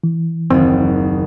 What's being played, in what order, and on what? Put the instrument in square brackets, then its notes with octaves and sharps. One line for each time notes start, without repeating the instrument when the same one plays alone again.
[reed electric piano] E3
[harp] F#1 D#2 [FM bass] C4